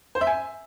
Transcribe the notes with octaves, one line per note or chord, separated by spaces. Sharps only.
C5
E5
G#5